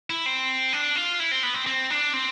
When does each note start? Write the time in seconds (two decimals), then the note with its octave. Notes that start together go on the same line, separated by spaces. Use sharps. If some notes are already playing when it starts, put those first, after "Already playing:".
0.10 E4
0.26 C4
0.73 D4
0.96 F4
1.20 E4
1.31 C4
1.43 B3
1.54 C4
1.67 C4
1.90 D4
2.13 C4